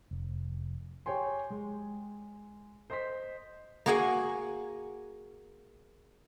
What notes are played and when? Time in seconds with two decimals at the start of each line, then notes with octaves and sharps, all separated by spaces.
0.11 F1
1.06 G4 C#5 G5 G#5 C6
1.50 G#3
2.90 C5 D#5 C6 B6
3.86 A#3 F#4 G#4 F#5 G#5